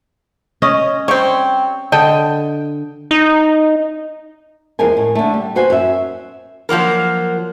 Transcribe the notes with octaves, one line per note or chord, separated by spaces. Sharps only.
C#4 D#5
G3 C4 C#5
D3 A4 D#5 G5
D#4
E2 F3 G#3 A#4 G#5
A2
D3 A3
G3
B3 F#4 C5 G#5
F#2 E5
F3 F#3 A#3 A#4